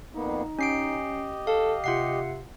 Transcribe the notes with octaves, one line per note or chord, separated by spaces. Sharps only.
F2 A#3 B3 D#4
C#4 G4 D#5 C7 D7
A4 F5
C3 F4 F#5 C7